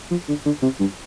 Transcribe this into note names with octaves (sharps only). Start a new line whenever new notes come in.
F3
D3
D3
C3
G2